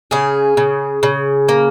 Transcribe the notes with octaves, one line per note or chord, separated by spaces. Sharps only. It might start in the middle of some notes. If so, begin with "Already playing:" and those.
C#3 G#4
C#3
C#3
A#3